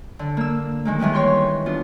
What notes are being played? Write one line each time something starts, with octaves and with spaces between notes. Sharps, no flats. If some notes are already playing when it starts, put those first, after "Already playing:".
D3
A#3 E6
D#3 G#3 A#3
D#3 E3 G3 G#3 B3
C#5 G5 C6 G6
B3 D4 F4